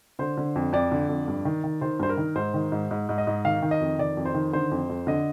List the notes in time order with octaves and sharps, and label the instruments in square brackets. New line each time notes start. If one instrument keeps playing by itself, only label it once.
[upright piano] D3 C5
D3
F2
F2 D5
D3
F2
G2
D#3
D#3
D#3 C5
G2 C5
A#4
D#3
G#2 C5
D#3
G#2
G#2
G#2
D#5
G#2
D#3 F5
D#3
D#5
F2
D#3 D5
F2
C5
D#3
D3 C5
F2
F2
D3 D#5